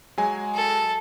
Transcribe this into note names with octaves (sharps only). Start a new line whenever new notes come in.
F#3 G#3 G#5
A4